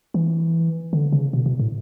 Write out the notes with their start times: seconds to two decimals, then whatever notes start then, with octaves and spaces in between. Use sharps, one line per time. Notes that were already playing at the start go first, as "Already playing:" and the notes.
0.14 E3
0.93 D3
1.12 C#3
1.33 B2
1.46 B2
1.60 A2